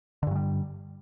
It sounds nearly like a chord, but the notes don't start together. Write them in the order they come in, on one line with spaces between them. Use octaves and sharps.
D3 G2 F#3 G3